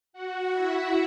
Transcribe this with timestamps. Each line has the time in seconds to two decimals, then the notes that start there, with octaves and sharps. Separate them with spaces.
0.13 F#4 F#5
0.52 E4 E5